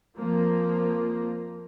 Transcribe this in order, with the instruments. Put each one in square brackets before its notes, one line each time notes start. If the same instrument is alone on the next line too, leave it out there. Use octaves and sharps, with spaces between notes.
[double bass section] F2 F3 A#3